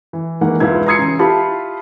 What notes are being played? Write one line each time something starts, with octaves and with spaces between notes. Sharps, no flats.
E3
D#3 E3 G#3 A#3 F#5
E1 C#2 G#2 E4 F4 G#6
A#5 C6 D#6 G#6 C7 C#7
C#3 E3
E4 F4 G4 A5 B5